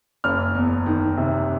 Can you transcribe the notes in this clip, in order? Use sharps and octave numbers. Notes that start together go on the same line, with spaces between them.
F#1 F6
E2
D#3
C3